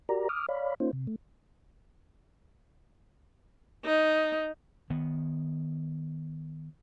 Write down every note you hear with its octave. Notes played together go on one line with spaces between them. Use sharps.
F#4 G4 A#4 D5 A#5
D6 D#6 F6
C#5 D5 F5 B5
A#3 C#4 D#4 F4 C5
C3
A3
D#4
D#3 B3